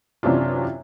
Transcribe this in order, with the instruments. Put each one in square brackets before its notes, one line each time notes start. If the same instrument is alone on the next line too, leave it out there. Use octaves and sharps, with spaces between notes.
[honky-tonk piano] F#2 C3 E3 C#4 D4 F4